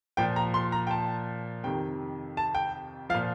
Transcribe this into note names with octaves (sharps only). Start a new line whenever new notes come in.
A#2 F3 G5
A#5
C6
A#5
G5
A5
F2 C3 D#3 G5
A5
G5
F3 F5
A#2